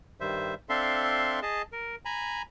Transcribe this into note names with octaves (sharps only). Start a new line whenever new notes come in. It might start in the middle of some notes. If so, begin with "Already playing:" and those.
G2 D#3 G3 C5 E5
C4 D4 A4 E5 F5 C6
G#4 D#5 A5
A#4
G#5 A#5 B5